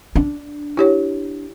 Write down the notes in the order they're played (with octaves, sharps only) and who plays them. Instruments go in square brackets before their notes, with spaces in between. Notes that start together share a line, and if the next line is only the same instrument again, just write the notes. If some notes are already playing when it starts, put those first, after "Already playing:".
[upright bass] D4
[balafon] E4 G4 C#5